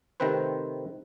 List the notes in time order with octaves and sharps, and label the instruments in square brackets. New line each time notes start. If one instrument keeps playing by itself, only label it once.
[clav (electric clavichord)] C3 D#3 A3 C4 B4 C5